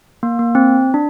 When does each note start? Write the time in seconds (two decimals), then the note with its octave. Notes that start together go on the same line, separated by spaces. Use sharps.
0.23 A#3
0.39 A#3
0.55 C4
0.94 D4